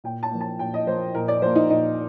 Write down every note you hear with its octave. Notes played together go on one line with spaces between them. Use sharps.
A#2 G5
A5
F3 A#3
A5
A#2 G5
D#5
F3 A#3 C5
A#2 A#4
D5
F3 A#3 C5
D#4
A#2 D#4